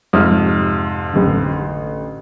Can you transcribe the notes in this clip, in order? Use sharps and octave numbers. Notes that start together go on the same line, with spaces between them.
F2 G#2 C3 E5 F6
A1 D3